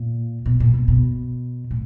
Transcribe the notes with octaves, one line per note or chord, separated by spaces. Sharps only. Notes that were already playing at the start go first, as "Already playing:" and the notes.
Already playing: A#2
B2
A#2
B2
B2
A2